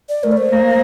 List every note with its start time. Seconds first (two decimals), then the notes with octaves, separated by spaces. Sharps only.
0.09 D5
0.23 A3 A#4
0.32 D5
0.37 C5
0.52 A#3